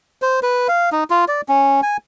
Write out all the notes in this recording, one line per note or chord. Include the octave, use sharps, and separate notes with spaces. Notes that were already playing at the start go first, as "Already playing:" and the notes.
C5
B4
F5
D#4
F4
D5
C#4
G#5